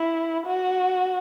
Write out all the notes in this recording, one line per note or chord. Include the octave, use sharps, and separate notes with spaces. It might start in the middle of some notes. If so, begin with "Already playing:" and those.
Already playing: E4
F#4